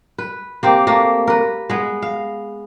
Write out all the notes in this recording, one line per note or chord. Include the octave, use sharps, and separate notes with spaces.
B4
A#3 C4 G4
A3 A#3
A#4 B4
G#3 B3
F5